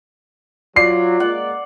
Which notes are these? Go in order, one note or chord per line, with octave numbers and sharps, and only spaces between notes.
F#3 F4 D5 C7
G#3 A#3 D5 F#5